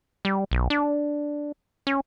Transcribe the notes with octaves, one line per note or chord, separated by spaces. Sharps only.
G3
B1
D4
C#4